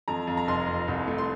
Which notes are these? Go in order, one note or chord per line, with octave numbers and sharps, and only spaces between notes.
F2 A#5
F2
A#5
F1 C6
F2
C2
A3
C6